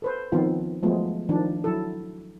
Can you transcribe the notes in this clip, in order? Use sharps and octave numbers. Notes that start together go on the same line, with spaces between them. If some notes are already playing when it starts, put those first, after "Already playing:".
A4 B4 C5
D#3 F3 B3 C4 F4
F3 F#3 G#3 A3 B3 F4
D#3 F3 D4
F#3 E4 A4